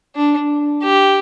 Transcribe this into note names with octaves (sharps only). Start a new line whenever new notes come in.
D4
G4